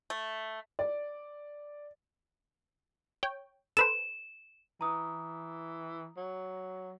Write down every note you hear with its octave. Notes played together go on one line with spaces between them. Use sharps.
A3
D5
C#5 G5
A4 B4 C5 E7
E3 A#5 D#6
F#3